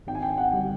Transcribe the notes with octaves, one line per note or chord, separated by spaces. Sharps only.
G#1 G5
G#5
G5
F#5
D3 G3